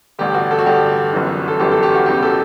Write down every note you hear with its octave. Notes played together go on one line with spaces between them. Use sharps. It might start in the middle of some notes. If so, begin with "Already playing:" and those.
A1 G2 D3 G4
F#4
A4
F#4
A1 G2 D3 G4
G1 F#2 E3
A4
G1 F#2 E3 G4
A4
G4
F#4
E1 E2 C#3 E3 G4
A4